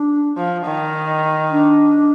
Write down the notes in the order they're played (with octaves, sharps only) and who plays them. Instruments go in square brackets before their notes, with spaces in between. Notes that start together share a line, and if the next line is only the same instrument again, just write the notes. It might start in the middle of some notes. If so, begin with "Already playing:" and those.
Already playing: [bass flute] D4
[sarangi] F3
D#3
[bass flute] D4